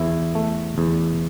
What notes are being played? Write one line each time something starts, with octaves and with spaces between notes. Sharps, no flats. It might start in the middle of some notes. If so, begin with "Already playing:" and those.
Already playing: E2 E4
A3
E2